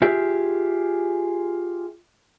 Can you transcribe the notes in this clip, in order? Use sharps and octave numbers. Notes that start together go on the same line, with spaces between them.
F4 G4 G#4 E5